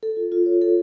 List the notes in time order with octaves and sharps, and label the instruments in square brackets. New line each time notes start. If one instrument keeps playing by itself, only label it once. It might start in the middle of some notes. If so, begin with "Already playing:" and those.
[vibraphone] A4
F4
F4
C#5
A4